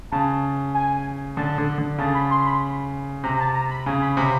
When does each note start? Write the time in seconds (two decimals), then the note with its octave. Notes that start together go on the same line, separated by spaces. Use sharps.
0.12 C#3 A5
0.74 G#5
1.36 D3 A5
1.58 D3
1.78 D3
1.98 C#3 A5
2.15 B5
2.31 C6
2.46 B5
3.24 C3 A#5
3.39 A5
3.55 A#5
3.70 B5
3.86 C#3 G#5
4.01 B5
4.17 C3 B5